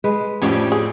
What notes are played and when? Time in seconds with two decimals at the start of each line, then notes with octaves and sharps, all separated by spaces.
0.04 G#3 B4
0.42 F2 A2 F3 B3 C#4 D4 F#4 G4
0.72 G#4